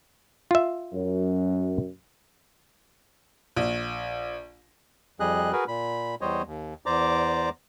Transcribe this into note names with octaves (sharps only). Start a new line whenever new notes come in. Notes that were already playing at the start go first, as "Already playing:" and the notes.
F4 E5
F#2
A#1
F2 G3 G#4 D#5 F#6
F#4 G#4 A#4 B4
A#2 B5
E2 G3 C5 C#5 D#5
D#2
E2 C5 D5 A#5 D6